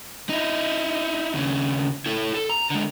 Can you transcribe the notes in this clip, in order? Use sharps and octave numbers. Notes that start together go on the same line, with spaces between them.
D#4 E4
D#2 C#3
E4 A4
A4
A#5
D3 G#3